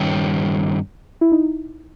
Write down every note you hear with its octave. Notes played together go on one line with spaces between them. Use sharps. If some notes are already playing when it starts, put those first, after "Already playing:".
Already playing: G2 D#3 G3 C#4 G4
E4
D#4